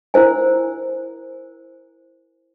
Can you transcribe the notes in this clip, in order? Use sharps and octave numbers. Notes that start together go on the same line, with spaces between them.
E4 A#4 C5 G#5